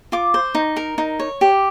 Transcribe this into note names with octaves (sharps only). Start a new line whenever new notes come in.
F4 D6
C5
D#4
A#4
D#4
C#5
G4